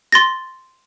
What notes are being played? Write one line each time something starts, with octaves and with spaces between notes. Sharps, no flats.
C6 A6 A#6